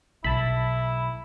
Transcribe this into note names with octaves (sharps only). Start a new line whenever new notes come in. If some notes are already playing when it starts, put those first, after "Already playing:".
B1 E4 A5 B5